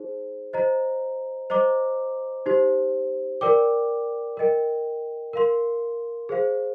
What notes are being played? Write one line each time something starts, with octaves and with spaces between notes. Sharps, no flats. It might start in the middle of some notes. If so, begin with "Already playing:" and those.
Already playing: D#4 G#4 C5
C5 D#5 A#5
C5 D#5 A#5 D6
D#4 G4 C5
A#4 D5 G5 D6
A#4 D#5 G5
A#4 F5 C6
G#4 C5 F5